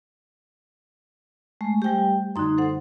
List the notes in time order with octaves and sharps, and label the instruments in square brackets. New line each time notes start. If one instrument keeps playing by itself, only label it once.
[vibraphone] G#3 [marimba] A3
[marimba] G3 C5 G#5 [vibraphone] G4 G5
[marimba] G3
[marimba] F#2 D3 [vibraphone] D#4 C6
[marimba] A4 C5 F#5